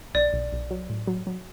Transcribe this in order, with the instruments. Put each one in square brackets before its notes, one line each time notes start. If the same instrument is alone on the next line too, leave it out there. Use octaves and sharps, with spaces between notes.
[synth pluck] B1 [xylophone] D5
[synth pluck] B1
B1
F#3
A2
F#3
F#3